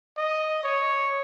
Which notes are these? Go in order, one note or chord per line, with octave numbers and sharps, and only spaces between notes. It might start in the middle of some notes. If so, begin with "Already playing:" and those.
D#5
C#5